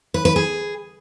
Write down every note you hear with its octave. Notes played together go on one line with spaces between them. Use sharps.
B4
B4
G#4